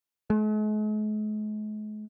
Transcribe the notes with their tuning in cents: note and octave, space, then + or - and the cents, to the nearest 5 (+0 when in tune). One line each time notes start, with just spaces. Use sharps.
G#3 +45